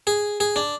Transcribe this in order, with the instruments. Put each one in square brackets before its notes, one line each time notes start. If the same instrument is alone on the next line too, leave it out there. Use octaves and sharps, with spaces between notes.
[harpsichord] G#4
G#4
D4